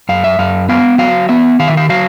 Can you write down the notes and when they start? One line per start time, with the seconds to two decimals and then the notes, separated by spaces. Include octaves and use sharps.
0.09 F#2 F5
0.24 E5
0.39 F#2 F5
0.69 B3 F5
0.98 F#3 F5
1.29 B3 E5
1.60 D#3 F5
1.68 E5
1.77 F5
1.89 F#3 F5